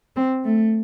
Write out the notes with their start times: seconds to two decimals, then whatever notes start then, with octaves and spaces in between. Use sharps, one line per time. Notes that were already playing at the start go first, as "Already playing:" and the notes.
0.16 C4
0.45 A3